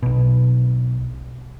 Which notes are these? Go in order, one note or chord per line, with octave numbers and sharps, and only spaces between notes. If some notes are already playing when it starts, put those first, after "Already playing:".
B1 B2